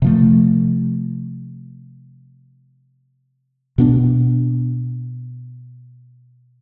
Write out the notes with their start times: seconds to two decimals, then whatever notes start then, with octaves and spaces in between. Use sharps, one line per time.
0.02 C3 F3 A3
3.78 B2 B3 D4